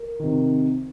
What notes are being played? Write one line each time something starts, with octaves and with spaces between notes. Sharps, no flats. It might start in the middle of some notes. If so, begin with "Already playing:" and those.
Already playing: A#4
C3 D#3